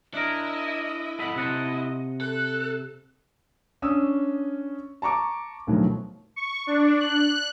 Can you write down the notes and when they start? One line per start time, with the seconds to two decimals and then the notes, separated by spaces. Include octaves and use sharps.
0.14 D4 E4 A#4 D#5
1.19 A4 D#5 F#5 B5
1.36 C3 D#5 F#5 A5
2.21 A4 F#6
3.82 C#4 D4 D#6 E6
5.02 A5 A#5 C#6 D6
5.67 D2 B2 D#3 F3 F#3
6.36 C#6
6.67 D4
7.00 F#6